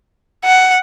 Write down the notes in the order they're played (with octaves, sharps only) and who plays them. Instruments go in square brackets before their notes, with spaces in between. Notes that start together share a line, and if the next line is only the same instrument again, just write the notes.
[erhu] F#5